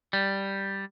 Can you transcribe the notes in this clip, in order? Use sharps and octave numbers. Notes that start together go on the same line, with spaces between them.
G3